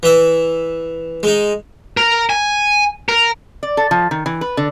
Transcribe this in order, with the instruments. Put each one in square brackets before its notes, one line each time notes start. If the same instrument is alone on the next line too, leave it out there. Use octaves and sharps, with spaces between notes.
[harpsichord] E3 E5
G#3 D#4
[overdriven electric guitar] A#4
G#5
A#4
[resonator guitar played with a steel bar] D5
A4
F3
D#3
E3
B4
D3